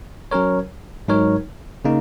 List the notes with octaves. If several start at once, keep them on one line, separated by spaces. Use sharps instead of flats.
F#3 C#4 A#4 C#5
G#2 F#3 D#4 A#4 C#5
C#3 A#3 D#4